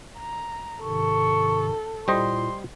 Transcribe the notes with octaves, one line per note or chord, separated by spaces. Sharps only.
A#5
G#2 C3 D#3 A4 C#6
A#2 G3 E4 F4 C5 D#5 C6